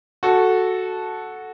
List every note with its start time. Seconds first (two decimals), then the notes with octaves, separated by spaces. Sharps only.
0.23 F#4 A4